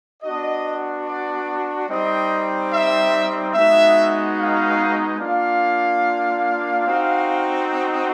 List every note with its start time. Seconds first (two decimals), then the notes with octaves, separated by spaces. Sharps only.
0.23 B3 D4 F#4 D#5
1.07 D5
1.88 G3 C4 D#4 D#5
2.72 E5
3.54 G#3 B3 D#4 F#4 E5
4.38 F5
5.19 A#3 D4 F4 F5
6.86 C4 D#4 F#4